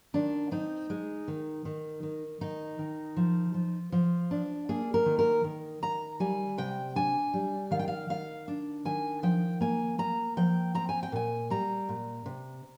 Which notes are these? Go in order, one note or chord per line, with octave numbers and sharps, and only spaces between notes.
D#3 D4
C4 D#4
G#3
D#3
D#3
D#3
D#3 D#4
D#3
F3
F3
F3
D4
A#3 G#4
A#4
D#3
A#4
D#3
D#3 A#5
G3 G#5
C3 G5
D4 G#5
G3
D#3 F5
G5
F5
D#3 F5
D4
D#3 G#5
F3 G5
A#3 G#5
A#3 A#5
F3 G5
C4 A#5
G#5
G5
A#2 G#5
G3 A#5
A#2
C3